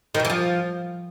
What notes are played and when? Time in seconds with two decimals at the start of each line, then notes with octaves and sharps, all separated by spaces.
0.15 D#3
0.20 B2
0.25 E3
0.30 F3